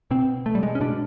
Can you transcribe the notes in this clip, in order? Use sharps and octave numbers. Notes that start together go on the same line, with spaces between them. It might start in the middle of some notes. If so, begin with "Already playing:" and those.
B2 C4
A3
G3
G#3
C#4
B2 D4